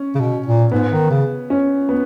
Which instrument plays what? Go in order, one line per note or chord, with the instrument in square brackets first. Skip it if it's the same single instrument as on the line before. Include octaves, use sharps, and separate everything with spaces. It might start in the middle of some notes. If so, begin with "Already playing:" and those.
Already playing: [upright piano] C#4
[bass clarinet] C#3
B2
A#2
[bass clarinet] G#2 [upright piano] B3
[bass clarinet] D#3
C#3
[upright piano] C#4
B3